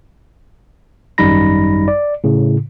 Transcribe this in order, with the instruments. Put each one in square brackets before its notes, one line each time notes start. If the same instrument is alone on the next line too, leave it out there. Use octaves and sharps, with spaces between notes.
[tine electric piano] G#1 F#2 G3 D#4 B5 A#6
D5
A2 C#3